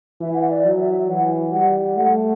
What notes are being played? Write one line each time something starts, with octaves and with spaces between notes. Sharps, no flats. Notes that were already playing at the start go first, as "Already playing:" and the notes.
E3 E5
F#5
E5
D5
F#3
E5
E3 F#5
G3 F#5
A3 F#5